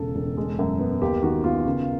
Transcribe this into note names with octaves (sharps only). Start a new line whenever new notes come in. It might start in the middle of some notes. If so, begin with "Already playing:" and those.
Already playing: E1 C#3 A4
E1
G#3
F#2
B3
D#2 G4
D#3 F#4
B3 F4
C#3